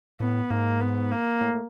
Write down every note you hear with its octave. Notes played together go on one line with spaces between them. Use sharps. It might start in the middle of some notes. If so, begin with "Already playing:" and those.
A2 B3
G#2 A#3
B3
A#3
A2
A2